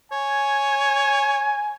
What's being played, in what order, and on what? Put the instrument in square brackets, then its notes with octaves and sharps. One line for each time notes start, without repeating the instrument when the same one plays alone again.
[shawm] C#5 [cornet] G#5